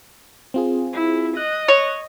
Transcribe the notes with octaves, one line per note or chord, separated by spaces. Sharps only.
C4 F4 G#4
E4
D#5 F#6
C#5